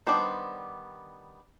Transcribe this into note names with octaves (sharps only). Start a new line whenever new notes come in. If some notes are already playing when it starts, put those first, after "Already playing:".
D#3 G3 B3 D4 C5